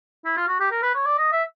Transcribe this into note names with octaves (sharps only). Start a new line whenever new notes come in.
E4
F4
F#4
G4
A#4
B4
C#5
D5
D#5
E5